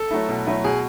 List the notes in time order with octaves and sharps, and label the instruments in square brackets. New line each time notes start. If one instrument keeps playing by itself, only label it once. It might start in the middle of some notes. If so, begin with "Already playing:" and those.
Already playing: [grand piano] A4
[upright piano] F#3 A3 E4
B2
F#3 A3 E4
[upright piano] B2 [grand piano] G#4